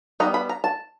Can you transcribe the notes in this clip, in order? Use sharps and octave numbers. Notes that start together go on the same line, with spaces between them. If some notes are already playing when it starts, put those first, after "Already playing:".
G3 B3 D#4 A#5
B5
A#5
A5